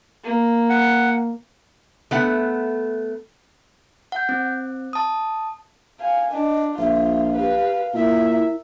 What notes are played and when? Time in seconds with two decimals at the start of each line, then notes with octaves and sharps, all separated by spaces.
0.24 A#3
0.70 F#5
2.11 A3 B3 F#5
4.12 F#5 G6
4.29 C4
4.93 A5 D#6
6.00 F5 G#5
6.32 D4 D#5
6.78 A#1 F4 E5
7.36 G4 B4 F5
7.94 A#2 E4 A#4 E5